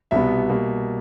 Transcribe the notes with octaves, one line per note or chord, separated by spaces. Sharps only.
C2 B2 G3 B3 E5
B2 G3 A#3